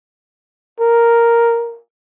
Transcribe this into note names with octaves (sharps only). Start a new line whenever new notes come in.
A#4